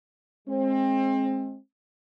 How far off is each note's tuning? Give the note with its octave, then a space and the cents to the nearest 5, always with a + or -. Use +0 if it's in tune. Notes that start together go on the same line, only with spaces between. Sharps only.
G#3 +15 C4 +30